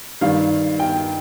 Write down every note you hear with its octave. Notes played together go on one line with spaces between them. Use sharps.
G2 D#3 F5
G5